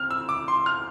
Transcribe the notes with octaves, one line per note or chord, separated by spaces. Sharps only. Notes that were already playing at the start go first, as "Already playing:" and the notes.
Already playing: C4 F6
E6
D6
C6
F6